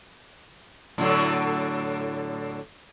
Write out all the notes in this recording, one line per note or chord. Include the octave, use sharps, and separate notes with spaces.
A2 D3 F#3